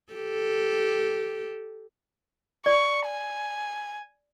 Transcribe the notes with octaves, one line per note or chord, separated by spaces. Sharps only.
G4 A4
D5 C#6
G#5